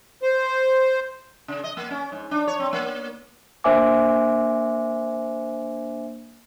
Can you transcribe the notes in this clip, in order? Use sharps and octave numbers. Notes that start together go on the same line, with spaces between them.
C5
C#3
D#5
A#3
C#4
G#2
D4
C#5
C4
A#3
A#3 D4 C5 E5 G#5 D6